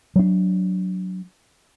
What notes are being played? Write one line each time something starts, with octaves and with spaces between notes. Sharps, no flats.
F#3 D4